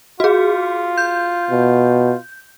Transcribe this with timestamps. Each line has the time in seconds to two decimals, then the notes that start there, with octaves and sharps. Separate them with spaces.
0.20 F4 F#4 G#4
0.98 G6
1.50 B2